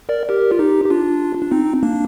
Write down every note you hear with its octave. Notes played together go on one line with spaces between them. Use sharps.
A#4 D5
G4 A#4
F4
D#4 G4
G4
D4 F4
D4
C4 D#4
A#3 D4